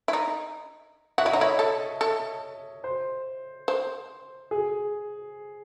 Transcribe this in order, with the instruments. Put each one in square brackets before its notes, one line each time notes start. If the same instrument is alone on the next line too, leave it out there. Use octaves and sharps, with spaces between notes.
[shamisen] E4
D#4
[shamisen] F#4 [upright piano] E5
[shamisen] E4 [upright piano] D#5
[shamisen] D#4 [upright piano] C#5
[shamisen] E4 [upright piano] D#5
[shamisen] A4
A4
[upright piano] C5
[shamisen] C5
[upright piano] G#4